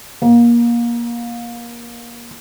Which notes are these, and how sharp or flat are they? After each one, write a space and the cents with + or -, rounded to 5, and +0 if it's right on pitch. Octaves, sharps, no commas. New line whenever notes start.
A#3 +25